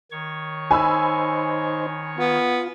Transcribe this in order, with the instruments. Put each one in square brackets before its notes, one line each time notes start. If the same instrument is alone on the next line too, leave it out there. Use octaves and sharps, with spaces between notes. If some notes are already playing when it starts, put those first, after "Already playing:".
[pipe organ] D#3 C#5 C#6
[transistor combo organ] D#4 C5 [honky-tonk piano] G#5 B5 E6
[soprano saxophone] B3 [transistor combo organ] F4